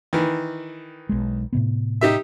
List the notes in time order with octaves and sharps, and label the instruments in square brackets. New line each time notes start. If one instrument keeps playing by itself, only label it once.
[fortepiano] D#3 E3
[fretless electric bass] B1 G#3
A2 C3 B3
[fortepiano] D#4 G4 E5